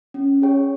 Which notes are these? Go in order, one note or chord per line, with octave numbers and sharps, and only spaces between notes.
C#4
G#4 C#5 G5